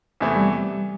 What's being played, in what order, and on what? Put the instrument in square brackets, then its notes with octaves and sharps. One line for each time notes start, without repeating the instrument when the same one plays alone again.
[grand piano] E2 C3 E3 A3
[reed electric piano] G3